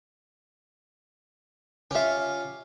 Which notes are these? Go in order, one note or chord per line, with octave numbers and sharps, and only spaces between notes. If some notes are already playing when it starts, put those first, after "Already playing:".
C#4 F4 G4 E5